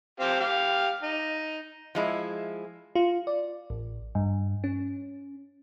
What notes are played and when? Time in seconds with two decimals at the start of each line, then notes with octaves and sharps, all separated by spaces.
0.20 C4 G4 F5
0.40 G4 F5
1.02 D#4
1.95 F3 G#3 E4
2.95 F4
3.27 D5
3.70 A1
4.15 G2
4.64 C#4